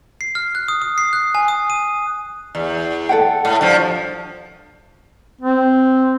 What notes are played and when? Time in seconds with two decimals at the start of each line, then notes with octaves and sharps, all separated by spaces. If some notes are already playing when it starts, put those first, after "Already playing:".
0.21 C7
0.35 F6
0.55 F#6
0.68 D#6
0.82 D#6
0.98 C7
1.13 F#6
1.35 G#5
1.48 D#6
1.70 D#7
2.55 E2
3.09 A4 F#5 G5
3.45 A2
3.61 G2 F3
5.41 C4